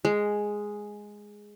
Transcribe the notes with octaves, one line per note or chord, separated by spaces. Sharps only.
G#3